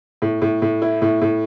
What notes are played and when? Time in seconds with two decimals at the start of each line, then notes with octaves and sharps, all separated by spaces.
0.22 A2
0.42 A2
0.62 A2
0.82 E4
1.02 A2
1.21 A2